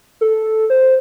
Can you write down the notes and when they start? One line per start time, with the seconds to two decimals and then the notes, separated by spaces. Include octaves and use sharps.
0.21 A4
0.70 C5